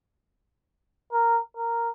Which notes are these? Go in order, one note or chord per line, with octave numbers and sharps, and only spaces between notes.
A#4
A#4